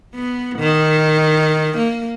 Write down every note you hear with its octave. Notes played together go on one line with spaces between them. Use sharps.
B3
D#3
A#3